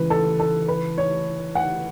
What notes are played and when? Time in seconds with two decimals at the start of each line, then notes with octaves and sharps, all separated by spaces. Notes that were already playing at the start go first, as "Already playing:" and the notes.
Already playing: C#3 E3 G#3 B4
0.10 A4
0.40 A4
0.68 B4
0.98 C#5
1.55 F#5